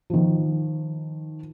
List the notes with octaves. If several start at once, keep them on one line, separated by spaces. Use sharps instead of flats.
D#3 F3